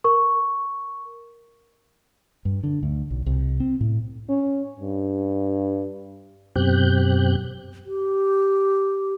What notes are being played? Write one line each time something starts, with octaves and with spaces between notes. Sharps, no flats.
A#4 C#6
G2
D3
D2
B1
C2
C4
A2
C#4
G2
F#2 B2 C4 G4 F#6 G6
G4